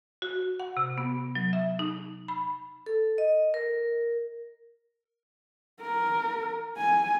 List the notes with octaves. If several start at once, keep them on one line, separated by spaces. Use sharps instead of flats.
F#4
F#5
C3
B3
F#3
E5
D#4
B5
A4
D#5
A#4
A#4
G#5